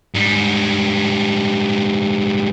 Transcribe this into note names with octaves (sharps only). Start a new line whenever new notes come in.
G#2 G3